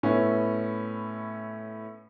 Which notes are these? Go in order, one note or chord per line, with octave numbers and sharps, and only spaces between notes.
A2 B3 C#4 E4